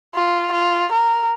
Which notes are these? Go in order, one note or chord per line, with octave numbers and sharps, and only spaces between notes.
F4
F4
A#4